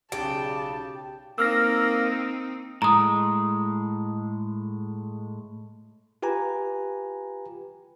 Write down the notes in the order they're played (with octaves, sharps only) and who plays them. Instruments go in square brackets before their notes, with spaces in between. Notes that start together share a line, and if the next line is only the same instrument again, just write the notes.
[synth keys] B1 D5 [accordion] C#3 [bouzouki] G4 [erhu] A5
[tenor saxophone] A#3 [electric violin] C4 D#4 [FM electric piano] E6 F6 A#6
[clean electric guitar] A2 G#3 [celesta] A#5 D#6
[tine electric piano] F4 G4 B4 G#5 A#5